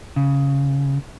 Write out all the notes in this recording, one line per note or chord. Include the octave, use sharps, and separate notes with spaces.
C#3